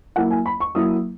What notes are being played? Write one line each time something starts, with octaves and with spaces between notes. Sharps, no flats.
F#3 A#3 E4 F#5
G#5
B5
C#6
F#3 A#3 E4 D#6